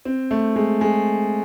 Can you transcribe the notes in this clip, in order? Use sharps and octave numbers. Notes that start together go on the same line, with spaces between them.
C4
A3
G#3
G#3